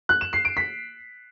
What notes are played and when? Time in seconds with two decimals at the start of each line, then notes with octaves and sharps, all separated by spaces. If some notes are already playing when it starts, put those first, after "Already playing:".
0.09 F#6
0.21 E7
0.33 C7
0.45 D7
0.57 B6